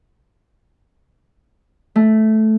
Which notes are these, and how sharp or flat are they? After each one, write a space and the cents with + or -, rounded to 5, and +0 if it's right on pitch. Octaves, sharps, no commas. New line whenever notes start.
A3 -10